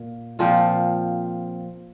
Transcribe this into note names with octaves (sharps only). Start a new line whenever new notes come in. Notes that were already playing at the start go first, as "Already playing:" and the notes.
Already playing: A#2
A#2 F3 C4 F4